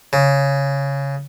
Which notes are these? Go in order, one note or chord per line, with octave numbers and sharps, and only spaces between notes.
C#3